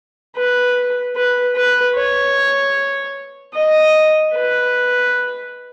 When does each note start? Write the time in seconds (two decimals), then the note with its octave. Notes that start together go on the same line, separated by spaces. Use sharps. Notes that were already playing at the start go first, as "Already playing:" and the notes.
0.36 B4
1.16 B4
1.56 B4
1.95 C#5
3.54 D#5
4.34 B4